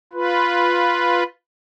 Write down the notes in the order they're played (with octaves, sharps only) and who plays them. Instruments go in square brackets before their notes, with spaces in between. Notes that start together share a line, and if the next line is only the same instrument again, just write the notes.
[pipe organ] F4 B4